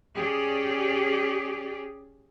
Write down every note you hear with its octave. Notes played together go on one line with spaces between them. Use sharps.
C#4 G4 G#4 D5